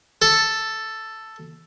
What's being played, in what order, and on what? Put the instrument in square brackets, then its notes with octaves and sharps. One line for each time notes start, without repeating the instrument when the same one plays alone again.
[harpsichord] A4